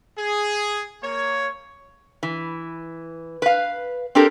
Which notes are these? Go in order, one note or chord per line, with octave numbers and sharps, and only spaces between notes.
G#4
A#3 C#5
E3
B4 F5
C4 D4 G4 A4 A#4